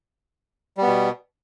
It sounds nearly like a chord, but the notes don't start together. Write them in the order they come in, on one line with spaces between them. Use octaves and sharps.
G3 B3 B2